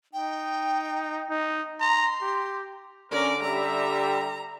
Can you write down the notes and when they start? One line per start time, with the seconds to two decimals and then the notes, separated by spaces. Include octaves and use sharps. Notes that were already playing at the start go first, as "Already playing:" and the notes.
0.13 D#4 G5
1.30 D#4
1.81 A#5 C6
2.22 G4
3.12 D3 C#4 A#4 D5
3.43 G3 E5 A#5